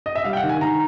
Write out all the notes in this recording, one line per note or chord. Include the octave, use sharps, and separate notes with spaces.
D#5
E5
G3 F5
G5
F#5
D#3
G#5
D#3 A#5